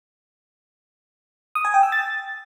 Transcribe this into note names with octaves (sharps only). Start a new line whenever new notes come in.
D#6
G#5
G5
E6
A6